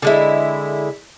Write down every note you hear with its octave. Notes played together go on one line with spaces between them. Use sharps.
D3 G#3 E4